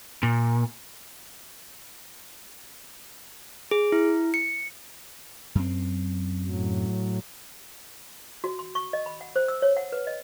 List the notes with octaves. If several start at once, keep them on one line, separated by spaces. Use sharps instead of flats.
A#2
G#4
E4
C#7
F#2 C4
A2 F#3
F#4
C6
C#6
D#5
B5
F#5
C5
E6
C#5
F#5
B4
D#5